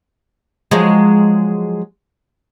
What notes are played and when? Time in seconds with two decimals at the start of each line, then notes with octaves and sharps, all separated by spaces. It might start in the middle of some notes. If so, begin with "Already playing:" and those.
0.71 F3 F#3 G#3